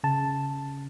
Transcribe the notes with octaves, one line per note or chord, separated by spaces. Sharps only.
C#3 A5